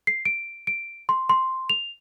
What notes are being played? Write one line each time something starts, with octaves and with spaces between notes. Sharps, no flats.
C7
D7
D7
C6
C6
F7